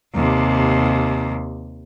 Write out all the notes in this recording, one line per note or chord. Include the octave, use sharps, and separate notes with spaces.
D#2 C3